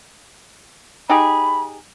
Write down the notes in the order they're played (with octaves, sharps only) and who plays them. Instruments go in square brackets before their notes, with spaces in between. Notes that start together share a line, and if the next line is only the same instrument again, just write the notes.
[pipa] D#4 G4 G#4 [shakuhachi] B5